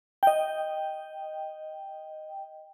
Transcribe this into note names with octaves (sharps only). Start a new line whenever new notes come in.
D#5 G5